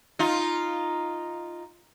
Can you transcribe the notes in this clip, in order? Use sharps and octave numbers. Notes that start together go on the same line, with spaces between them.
D#4 F4